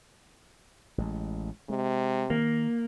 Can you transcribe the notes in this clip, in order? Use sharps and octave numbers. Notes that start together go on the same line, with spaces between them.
A1 G#3
C3 G#3
D#3 A#3